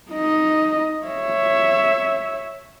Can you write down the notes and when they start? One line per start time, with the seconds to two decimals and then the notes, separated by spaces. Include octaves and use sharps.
0.11 D#4 D#5
1.06 C#5 E5